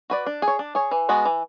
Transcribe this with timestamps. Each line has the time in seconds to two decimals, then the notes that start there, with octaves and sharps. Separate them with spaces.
0.10 F#4 B4 D5
0.26 D4
0.42 G#4
0.48 C#5
0.59 D4
0.75 G#4 C#5
0.91 E3
1.09 G#3 B3 F#4
1.25 E3